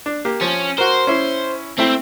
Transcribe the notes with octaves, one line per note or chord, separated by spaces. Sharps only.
D4
A#3 G4
F3 C#4
F#4 A#4 C5
C#4 E4
A3 C4 E4 G5